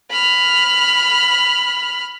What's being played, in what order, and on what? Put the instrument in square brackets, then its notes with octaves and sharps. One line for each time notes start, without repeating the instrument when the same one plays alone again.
[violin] B5 F6